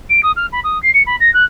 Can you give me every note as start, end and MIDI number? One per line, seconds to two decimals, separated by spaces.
0.10 0.21 98
0.23 0.32 87
0.36 0.46 89
0.52 0.60 83
0.64 0.81 87
0.83 0.90 96
0.94 1.03 97
1.06 1.16 83
1.20 1.33 94
1.33 1.44 90